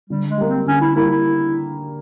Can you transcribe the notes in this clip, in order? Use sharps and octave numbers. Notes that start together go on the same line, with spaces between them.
D3 G3
G#3
G3 A#3
C4
D3 C#4
E4
G3 A#3 E4
E4